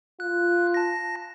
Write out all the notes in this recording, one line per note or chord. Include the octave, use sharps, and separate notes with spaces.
F4 F#6
A5 A#6